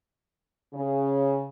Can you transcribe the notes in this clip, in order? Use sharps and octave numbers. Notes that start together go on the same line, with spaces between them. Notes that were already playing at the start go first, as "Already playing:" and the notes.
C#3